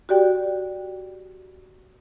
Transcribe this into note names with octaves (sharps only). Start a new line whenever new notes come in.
F#4 G4 D5 G5